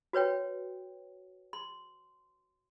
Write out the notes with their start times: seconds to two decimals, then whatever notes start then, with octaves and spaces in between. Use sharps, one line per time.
0.13 F#4 B4 C#5 G5
1.53 C6